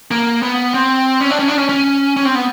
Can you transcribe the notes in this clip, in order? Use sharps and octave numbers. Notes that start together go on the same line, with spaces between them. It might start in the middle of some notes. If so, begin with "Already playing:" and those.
A#3
B3
C4
C#4
D4
C#4
D4
C#4
C#4
C#4
C4
B3